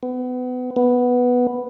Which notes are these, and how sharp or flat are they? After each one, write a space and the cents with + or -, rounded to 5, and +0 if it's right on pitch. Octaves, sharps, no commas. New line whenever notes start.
B3 +30
B3 +0